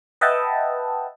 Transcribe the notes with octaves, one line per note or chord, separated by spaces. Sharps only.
B4 D#5 E5 F#5 G5 A5